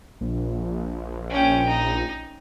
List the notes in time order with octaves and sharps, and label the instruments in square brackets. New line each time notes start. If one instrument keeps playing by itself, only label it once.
[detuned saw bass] A#1
[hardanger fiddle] C#4 G5
D#4